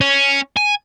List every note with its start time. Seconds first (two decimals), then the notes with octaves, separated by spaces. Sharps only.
0.01 C#4
0.57 G#5